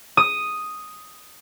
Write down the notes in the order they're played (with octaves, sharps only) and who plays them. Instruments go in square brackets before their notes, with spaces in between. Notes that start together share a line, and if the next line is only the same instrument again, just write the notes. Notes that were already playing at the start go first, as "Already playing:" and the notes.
[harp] D#6